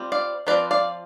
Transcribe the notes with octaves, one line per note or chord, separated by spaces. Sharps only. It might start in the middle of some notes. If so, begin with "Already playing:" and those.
Already playing: G3 C4 F4
D5 F5
F3 C4 F4 B4 D5
D5 F5